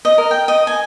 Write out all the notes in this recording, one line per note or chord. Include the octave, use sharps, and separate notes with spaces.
D#5
A#4
G5
D#5
G#5